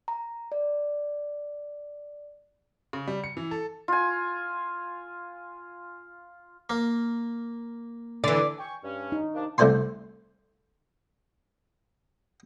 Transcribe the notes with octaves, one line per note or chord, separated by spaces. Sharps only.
A#5
D5
C#3
G3
C#7
E3
A4
F4 G#5
A#3
D3 E3 D5
G5 G#5 C#6
G2 C#4
D#4
C3 A#3 D4
C2 A3 C5 D5 G#5 C6